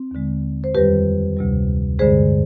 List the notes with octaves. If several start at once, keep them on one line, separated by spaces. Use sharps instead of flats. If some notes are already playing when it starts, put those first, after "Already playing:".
Already playing: C4
D#2 D3 G#3
C5
F2 D#3 G3 G4 B4
D2 C3 G3
G2 D3 G#3 G#4 C5